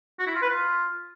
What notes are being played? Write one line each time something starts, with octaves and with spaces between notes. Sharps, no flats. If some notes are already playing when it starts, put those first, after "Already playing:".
F#4
E4
F4
B4
F4